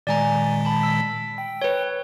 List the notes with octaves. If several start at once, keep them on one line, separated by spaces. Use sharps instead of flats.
A#2 D#3 G#3 D5 G#5 A#5
A5 B5
E6 B6
G5
B4 C#5